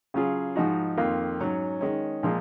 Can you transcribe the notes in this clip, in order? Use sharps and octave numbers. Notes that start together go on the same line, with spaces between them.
C#3 F#3 C#4 F4 G#4
G#2 F3 G#3 D#4 F#4
F2 D#3 A#3 F4
G#2 F#3 C#4
D#3 G#3 C#4
A#2 F3 G#3